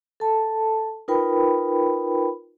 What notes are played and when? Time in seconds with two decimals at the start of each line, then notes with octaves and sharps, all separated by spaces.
0.20 A4 A5
1.08 D#4 F4 A#4 B4 G5 B5